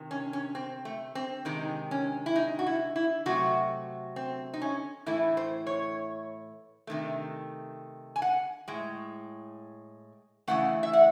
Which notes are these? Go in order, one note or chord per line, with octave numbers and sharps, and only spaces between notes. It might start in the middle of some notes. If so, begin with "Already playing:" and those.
Already playing: C3 D#3
C#4
C#4
C4
A3
C4
C3 D#3 G#3 D#4
C#4
E4
D#4
F#4
E4
E4
C3 F#3 A3 F#4
C4
D#4
C#4
A2 E3 A3 E4
C5
C#5
C3 D#3 A3
G#5
F#5
A2 G#3
C#3 E3 A3 F#5
E5
F#5